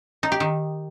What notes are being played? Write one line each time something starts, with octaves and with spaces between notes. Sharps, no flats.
D#4
G4
D#3